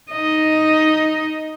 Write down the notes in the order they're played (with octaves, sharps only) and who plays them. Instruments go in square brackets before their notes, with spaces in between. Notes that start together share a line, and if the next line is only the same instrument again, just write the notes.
[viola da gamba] D#4 D#5